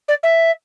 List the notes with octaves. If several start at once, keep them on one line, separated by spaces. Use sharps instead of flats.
D5
E5